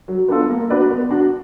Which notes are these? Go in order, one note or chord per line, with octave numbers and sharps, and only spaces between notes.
F#3
B3 D4 F4 A4
A#3
D4 F#4 B4 D5
B3
D4 F#4